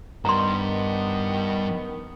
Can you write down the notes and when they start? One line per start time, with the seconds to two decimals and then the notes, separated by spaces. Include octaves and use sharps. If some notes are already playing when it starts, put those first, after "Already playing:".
0.25 G2 D#3 G3 B3 A#5 C6